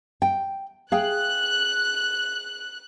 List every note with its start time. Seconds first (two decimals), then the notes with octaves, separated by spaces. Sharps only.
0.22 G5
0.92 G#4 F5 G5 F#6